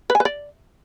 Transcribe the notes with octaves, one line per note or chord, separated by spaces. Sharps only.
B4
G#5
B4
D5